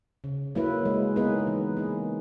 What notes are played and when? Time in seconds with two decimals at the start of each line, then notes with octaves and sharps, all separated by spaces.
0.24 C#3
0.55 F#3 A#3 E4 B4
0.85 G#3
1.16 B3 D#4 G#4 B4
1.47 E3
1.77 A#3 D#4 G#4